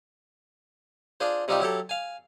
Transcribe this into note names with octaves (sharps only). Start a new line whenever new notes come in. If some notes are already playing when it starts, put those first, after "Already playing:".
D4 F4 G#4 C5
C3 G3 C4 D#4 F4 G4
F#3 E4 G4 A4
F5 G#5